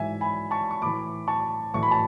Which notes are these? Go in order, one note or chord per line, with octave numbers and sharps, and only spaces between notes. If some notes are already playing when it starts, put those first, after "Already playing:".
Already playing: G#2 E3 E5 G#5
G#5 B5
A5 C#6
C#6
A2 E3 B5 D6
A5 C#6
A2 E3 C#6
B5
A5